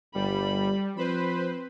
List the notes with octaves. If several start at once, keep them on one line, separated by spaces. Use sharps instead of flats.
G1 G3 B5
F3 C4 B4 C5 B5